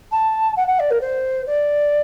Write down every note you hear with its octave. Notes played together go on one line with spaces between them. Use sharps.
A5
F#5
F#5
D5
A#4
C5
D5